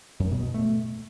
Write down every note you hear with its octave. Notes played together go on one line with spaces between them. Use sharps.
F#2
B2
B2
A3